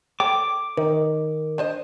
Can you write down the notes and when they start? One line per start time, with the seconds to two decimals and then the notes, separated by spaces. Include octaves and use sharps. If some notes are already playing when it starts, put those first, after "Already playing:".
0.20 A4 C#5 G5 D6
0.77 D#3 D#4
1.58 D4 C5 D#5